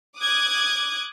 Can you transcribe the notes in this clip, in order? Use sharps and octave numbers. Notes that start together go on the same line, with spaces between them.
D6 D#6 F#6 G#6